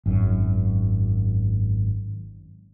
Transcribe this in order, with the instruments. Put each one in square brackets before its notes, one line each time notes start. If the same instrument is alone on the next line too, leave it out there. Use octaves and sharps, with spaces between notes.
[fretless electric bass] G#1 F#2